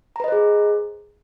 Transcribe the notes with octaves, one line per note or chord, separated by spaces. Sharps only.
G#4 B4 C5 D#5 A#5